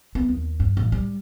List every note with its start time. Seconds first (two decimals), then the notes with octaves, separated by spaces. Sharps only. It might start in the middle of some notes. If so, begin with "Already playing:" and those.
0.15 B3
0.29 D#2
0.60 G2
0.77 A1
0.92 G3